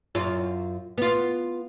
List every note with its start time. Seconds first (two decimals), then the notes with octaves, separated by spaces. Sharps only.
0.15 F#2 F4
0.98 B3 F4